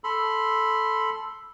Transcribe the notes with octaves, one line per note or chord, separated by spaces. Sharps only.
A4 B5 C6